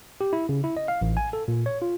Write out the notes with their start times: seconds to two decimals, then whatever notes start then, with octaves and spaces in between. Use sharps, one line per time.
0.21 G4
0.33 E4
0.49 C#3
0.64 E4
0.77 D#5
0.88 F5
1.01 A1
1.17 G#5
1.33 A4
1.48 A#2
1.66 C#5
1.82 F4